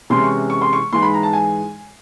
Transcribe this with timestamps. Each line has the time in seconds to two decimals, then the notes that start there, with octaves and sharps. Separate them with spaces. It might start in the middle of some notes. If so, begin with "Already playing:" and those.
0.10 C3 E3 G#3 C#4 C6
0.24 C#6
0.50 C#6
0.61 C6
0.73 C#6
0.92 G#2 E3 G#3 C6
1.02 B5
1.14 A#5
1.23 A5
1.33 G#5